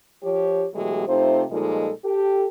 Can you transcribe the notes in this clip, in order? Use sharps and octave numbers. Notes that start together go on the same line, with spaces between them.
F3 G4 C#5
B2 E3 F#3 G#3 A3 G4
C3 A3 D#4 F4 C5
A#2 F3 G3 G#3 D#4 A4
G4 A4